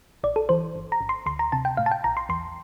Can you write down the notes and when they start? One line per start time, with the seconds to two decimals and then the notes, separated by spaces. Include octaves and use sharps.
0.23 A#1 D5
0.36 A4
0.49 E3 C5
0.76 G1
0.92 A#5
1.01 G1
1.09 C6
1.26 D2 C6
1.39 A#5
1.52 C3 A5
1.65 G5
1.77 A2 F5
1.86 A5
1.91 G5
2.04 A#1 A#5
2.17 C6
2.29 E2 C6